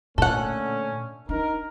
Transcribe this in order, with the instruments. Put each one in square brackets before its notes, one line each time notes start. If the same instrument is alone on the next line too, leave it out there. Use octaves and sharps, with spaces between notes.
[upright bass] A#2 [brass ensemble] D3 A3 C#4 [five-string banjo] A4 F#5
[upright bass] D4 [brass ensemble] D#4 A#4